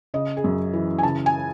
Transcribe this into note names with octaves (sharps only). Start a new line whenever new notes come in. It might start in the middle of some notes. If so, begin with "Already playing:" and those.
C#3 D#5
G#4
F#2
E3
G#5
C#3 A5
G#5